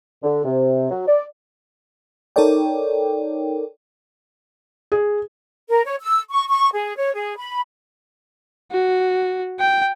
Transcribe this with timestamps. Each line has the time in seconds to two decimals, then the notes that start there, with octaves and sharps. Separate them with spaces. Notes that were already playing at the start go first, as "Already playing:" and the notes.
0.23 D3
0.45 C3
0.90 F#3
1.07 D5
2.36 D#4 A4 A#4 C#5 D5 G5
4.92 G#4
5.68 A#4
5.85 C#5
6.01 E6
6.30 C#6
6.48 C#6
6.73 G#4
6.97 C#5
7.15 G#4
7.37 B5
8.72 F#4
9.60 G5